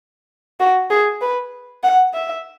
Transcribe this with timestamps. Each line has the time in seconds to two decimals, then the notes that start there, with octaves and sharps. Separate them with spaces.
0.60 F#4
0.90 G#4
1.21 B4
1.83 F#5
2.14 E5